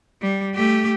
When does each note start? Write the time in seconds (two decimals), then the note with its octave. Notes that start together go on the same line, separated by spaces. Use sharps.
0.22 G3
0.55 A3 G4